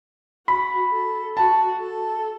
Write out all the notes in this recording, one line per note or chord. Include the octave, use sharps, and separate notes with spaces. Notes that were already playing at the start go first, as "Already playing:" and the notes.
F#4 B5
A4
F#4 A5
A4